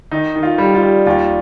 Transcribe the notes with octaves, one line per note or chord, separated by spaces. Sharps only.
D#3 D#4
D#3
F4
G3
F4
G3
D#2 F4